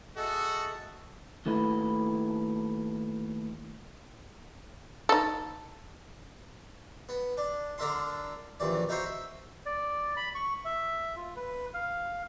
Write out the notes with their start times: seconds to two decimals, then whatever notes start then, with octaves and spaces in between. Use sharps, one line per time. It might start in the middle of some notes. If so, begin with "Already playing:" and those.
0.17 F#4 G#4 A4 D#5 E5
1.46 D#2 A3 E4 B4
5.09 D#4 A4
7.09 B3
7.37 D4
7.78 D3 D4 A#4 E5 A5 C6
8.60 A#1 D#2 E3 D5
8.89 D#4 E4 F#4 C5 C#5
9.06 E5
9.66 D5
10.17 B5
10.35 C#6
10.65 E5
11.16 F4
11.36 B4
11.74 F5